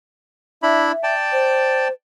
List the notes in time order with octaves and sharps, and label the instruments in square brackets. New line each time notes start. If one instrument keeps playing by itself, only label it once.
[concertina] D4 E4 B5 [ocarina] E5
[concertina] D5 G5 A5
[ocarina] C5